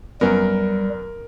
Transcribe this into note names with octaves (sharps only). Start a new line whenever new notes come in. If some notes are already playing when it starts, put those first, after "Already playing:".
F#2 G3 B3 A#4